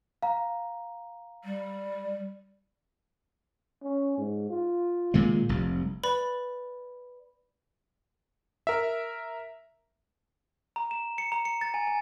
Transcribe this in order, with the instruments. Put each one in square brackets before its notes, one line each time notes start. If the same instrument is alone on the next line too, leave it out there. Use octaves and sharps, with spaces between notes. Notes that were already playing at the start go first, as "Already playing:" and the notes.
[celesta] F5 A#5
[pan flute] G3
[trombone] C#4
G#2
F4
[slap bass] A#2 D#3 G#3
F1 C2
[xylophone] B4 D5 B5
[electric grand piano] A#4 E5
[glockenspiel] A#5
E7
C#7
A#5
C#7
A6
G#5
G#5